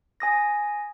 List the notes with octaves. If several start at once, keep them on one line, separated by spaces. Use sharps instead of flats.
G#5 D#6 A#6